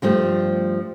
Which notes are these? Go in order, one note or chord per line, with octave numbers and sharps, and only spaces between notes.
G2 F3 G3 A3